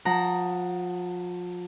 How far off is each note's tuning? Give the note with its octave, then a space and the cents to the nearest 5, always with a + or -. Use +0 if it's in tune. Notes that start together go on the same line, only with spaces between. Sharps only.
F3 +30 F#5 +0 A#5 +0